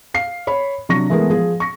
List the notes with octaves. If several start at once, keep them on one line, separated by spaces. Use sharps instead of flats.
F5 C7
C#5 B5
C3 F#3 D4 C#6 A#6
E3 G#3 A3 B3 G#4 A#4
F3 G#4
C#6 A#6